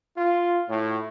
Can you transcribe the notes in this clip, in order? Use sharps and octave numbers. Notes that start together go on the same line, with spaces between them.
F4
A2